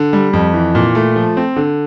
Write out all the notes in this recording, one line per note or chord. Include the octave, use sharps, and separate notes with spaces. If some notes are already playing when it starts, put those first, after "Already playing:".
Already playing: D3
G3
F2
E3
A#2
A3
F3
C4
D3